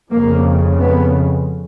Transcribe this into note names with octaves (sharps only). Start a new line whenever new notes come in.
F2 C#3 A#3
B3